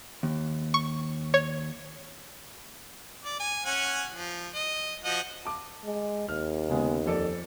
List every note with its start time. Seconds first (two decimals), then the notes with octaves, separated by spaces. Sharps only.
0.23 D#2
0.74 C#6
1.34 C#5
3.25 D5
3.40 G#5
3.66 C#4 F#5 G#5
4.12 F3
4.55 D#5
5.04 F3 F#4 D#5
5.45 A5 D6
5.84 G#3
6.28 D#2 F6
6.69 C#3 G#3 B3
7.06 F2 A4 D5